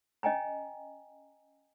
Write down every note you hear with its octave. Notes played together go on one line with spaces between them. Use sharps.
C#4 D#5 G5 G#5 A#5